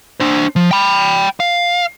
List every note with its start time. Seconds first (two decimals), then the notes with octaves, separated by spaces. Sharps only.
0.20 D4 C5
0.56 F3
0.71 G5 B5
1.40 F5